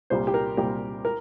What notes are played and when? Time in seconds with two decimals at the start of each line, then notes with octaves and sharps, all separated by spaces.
0.10 C2 A#2 G3 C5
0.27 G4
0.34 A#4
0.57 C2 A#2 G3 G4
1.05 A#4